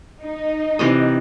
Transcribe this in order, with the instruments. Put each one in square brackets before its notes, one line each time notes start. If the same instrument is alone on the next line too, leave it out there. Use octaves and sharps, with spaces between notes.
[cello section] D#4
[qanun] C3 E3 D#5